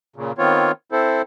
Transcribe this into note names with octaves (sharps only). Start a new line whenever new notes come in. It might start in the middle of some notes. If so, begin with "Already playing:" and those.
A#2 C#3
D#3 B3 C4 F4 C#5
C4 E4 A4 C5